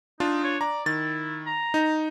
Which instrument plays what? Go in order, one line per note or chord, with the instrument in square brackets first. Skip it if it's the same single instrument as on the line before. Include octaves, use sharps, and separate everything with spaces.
[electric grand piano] D4 F4 [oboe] D#4
[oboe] C#5
[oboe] D5 [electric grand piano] A#5
[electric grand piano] D#3 A6 [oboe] E4
[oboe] A#5
[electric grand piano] D#4